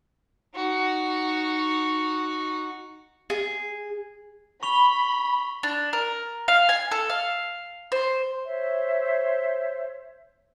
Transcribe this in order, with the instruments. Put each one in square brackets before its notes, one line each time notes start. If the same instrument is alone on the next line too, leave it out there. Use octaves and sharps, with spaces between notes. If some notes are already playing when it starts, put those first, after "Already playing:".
[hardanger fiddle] D#4 F#4
[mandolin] G#4
[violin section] B5 [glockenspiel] C#6 F7 G7
[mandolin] D4
A#4
F5
G#5
A4
F5
C5
[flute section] C5 C#5 E5